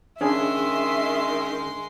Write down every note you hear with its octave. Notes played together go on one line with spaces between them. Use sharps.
D#3 G#3 C#4 D4 G#4 E5 C6